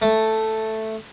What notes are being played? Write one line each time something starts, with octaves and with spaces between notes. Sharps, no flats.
A3